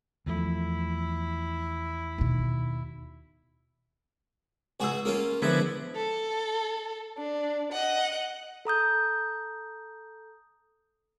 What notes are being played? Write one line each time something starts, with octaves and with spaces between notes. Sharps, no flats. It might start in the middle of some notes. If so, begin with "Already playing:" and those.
E2 F3 A3 E4
D#2 B2
C#2 F#4 G#4 G#5 E6
G#3 A#3 C#4 F4
D3 F3 G#3 B3 E4 B4 D6 E6
A4
D4
D#5 F#5
A4 A#5 D#6 G6